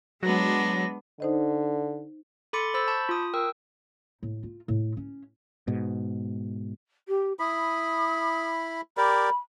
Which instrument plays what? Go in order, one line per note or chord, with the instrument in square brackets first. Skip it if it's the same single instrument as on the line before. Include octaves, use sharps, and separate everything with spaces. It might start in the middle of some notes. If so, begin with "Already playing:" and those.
[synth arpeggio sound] F#3 [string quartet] G#3 B3 D4 [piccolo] A#6
[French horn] D3 [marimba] D#4 C5 D#5
[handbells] A4 B5 C6 D6 A6 C#7
C5 B5 E6 A6
A5 B5 C#6 G6
F4 D#6
A#4 G5 E6
[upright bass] A2
F4
A2
C#4
[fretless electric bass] G#2 B2
[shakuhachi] G4
[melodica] E4 B5 [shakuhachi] D#6
[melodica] G4 A#4 D5 [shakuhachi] B5